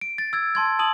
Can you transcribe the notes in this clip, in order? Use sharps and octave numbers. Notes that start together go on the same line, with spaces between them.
D7
A6
E6 G#6 A6
A5 C6 G#6
A5 D#6 F#7